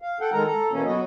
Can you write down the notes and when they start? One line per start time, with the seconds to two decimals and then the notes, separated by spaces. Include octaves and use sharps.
0.02 F5
0.21 A4 F#5 G5
0.33 D#3 G#3 A4 A#4 A#5
0.47 A4 A#5
0.72 B2 E3 A#3 C#4 A4
0.86 F#3 B3 F#4 D#5